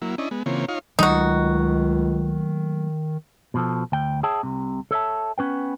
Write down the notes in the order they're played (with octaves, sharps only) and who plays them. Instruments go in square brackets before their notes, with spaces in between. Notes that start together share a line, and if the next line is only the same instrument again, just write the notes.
[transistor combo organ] F#3 A#3 E4
C#4 D4 E4 D#5
G#3 B3
C#3 E3 A#3 C4 F4 C#5
D#4 F4 C#5 F5
[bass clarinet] C#2 [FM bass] D#3 [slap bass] F#3 A3 A#3 [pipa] D#4 F#4
[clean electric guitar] B2 F3 A4
D2 G5
G#4 C#5 E5 G5 A5
C2 C3
A4 C#5 E5 A5
B3 C#4 B4 G5